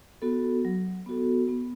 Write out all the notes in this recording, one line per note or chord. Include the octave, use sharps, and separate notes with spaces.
B3 F#4 A4
F#3
B3 F#4 A4
B3